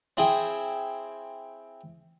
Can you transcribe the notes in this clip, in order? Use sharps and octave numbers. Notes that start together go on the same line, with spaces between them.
C4 E4 G#4 G5